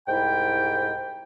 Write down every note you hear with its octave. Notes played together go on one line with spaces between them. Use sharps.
C2 G#2 E4 G5